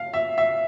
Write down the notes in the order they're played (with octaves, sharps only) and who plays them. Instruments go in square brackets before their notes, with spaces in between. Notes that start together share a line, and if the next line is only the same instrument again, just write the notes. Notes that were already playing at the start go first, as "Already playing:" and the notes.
Already playing: [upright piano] F5
E5
E5